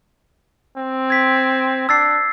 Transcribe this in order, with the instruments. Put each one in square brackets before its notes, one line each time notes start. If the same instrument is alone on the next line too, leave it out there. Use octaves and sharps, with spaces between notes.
[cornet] C4
[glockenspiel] G#6 B6
[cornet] D4 [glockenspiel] E6 A6 C7